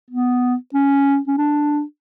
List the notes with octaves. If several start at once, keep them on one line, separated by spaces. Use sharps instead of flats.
B3
C#4
C#4
D4